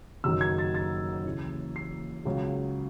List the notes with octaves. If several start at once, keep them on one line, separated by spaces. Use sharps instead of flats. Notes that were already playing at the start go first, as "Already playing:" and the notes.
F#1 F#2 D#3 F#3 E6
G#6
A6
A6
D#2 C#3 E3
C7
C#2 C#3 F#3